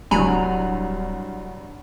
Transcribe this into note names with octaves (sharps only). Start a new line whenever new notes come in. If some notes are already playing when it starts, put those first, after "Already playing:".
D1 C2 G2 F#3 G#5 A#5 B5